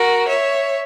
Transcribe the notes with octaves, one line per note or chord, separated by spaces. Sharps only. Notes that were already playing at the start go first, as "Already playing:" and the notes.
Already playing: F#4 A#4
C#5 E5